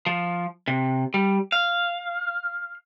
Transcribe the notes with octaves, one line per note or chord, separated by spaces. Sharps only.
F3
C3
G3
F5